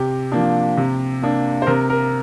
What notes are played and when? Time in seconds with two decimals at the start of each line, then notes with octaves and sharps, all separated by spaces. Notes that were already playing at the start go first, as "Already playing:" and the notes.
Already playing: C3 G4
0.32 F3 A#3 D4
0.77 C3
1.22 A#3 D4
1.62 C5
1.67 C3 A#4
1.90 A#4